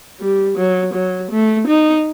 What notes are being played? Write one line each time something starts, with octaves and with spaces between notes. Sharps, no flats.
G3
F#3
F#3
A3
D#4